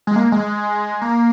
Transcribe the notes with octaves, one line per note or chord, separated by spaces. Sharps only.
G#3
A#3
G#3
A#3